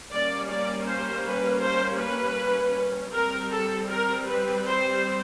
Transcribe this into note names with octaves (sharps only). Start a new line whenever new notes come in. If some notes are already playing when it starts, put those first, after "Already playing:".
G3 A#3 C#4 D5
D5
C5
B4
C5
B4
G3 C4 A#4
A4
A#4
B4
C5